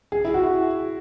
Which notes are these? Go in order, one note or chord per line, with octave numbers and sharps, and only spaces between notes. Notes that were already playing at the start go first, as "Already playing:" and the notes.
G#4
E4
F#4